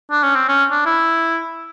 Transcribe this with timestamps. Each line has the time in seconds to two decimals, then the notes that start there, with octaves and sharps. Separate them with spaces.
0.11 D4
0.23 C#4
0.35 C4
0.48 C#4
0.71 D4
0.86 E4